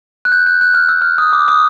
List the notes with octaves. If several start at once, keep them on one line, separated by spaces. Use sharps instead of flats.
F#6
G6
F#6
F#6
F6
E6
F6
D#6
D6
D#6